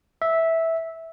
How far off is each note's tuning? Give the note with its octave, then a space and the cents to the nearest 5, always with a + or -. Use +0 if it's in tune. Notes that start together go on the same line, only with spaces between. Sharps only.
E5 -10